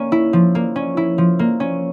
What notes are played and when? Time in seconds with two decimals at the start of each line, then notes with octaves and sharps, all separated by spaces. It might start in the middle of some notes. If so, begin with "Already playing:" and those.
Already playing: A#3 C#4
0.12 E4
0.33 F3
0.55 A#3
0.76 C#4
0.97 E4
1.18 F3
1.39 A#3
1.60 C#4